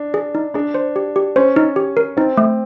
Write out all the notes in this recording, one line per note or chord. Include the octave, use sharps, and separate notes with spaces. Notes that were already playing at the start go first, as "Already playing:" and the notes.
Already playing: D4
G#4
D#4
D4 G#4
C5
G4
G4
C#4 C5
D#4
G4
A#4
C4 D#4
A3